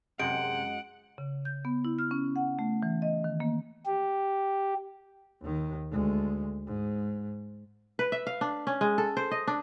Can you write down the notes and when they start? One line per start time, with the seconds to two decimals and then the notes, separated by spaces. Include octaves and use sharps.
0.19 F#2 C3 G#3 F#5 D7
1.18 C#3
1.45 G6
1.65 B3
1.85 E4
1.99 F6
2.11 C#4
2.36 F#5
2.59 A3
2.83 E3
3.02 D#5
3.24 D#3
3.40 A#3
3.86 G4
5.42 D#2 D#3
5.91 D2 G#3
6.67 G#2
7.99 B4
8.12 E5
8.27 F5
8.41 D4
8.67 C#4
8.81 G#3
8.98 A4
9.17 C5
9.31 D#5
9.47 D4